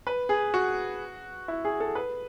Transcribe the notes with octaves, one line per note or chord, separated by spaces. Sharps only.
B4
G#4
F#4
E4
G#4
A4
B4